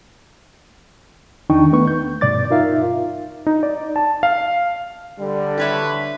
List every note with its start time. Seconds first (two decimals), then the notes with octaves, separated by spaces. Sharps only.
1.50 E2 D#3 D4 D#4 G5 C#6
1.71 A3 B3 B4 C#6
1.88 G6
2.21 G2 B2 D5 D6 A6
2.50 D#4 F4 A#4 E5 F5
3.47 D#4
3.63 D5
3.96 A5
4.23 F5
5.19 D3 G3
5.58 G4 B4 C#5 E5